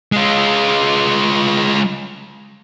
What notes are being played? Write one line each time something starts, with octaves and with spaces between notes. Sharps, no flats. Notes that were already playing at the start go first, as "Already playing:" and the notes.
G#3 F4